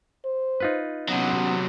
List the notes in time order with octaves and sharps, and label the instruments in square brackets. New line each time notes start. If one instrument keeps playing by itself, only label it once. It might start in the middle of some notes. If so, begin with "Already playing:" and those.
[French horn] C5
[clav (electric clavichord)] D#4 F4 B4
[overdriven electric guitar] C3 F#3 [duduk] B3 [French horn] C#4